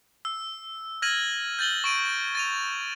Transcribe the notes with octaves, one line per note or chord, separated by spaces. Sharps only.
E6
F6 G#6 A#6 D#7 F#7
G6 A6 F#7 G7
C#6 D7 D#7
A6 D#7 F7